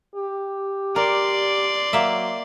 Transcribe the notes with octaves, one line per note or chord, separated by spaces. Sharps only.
G4
A#4 D5 C6
F#3 A#3 E5